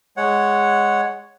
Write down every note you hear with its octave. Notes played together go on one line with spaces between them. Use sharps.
G#3 C#5 F#5